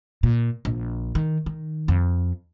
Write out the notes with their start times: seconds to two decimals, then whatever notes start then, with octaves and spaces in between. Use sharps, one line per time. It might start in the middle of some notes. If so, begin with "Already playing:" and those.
0.23 A#2
0.65 A#1
1.15 D#3
1.46 D#3
1.88 F2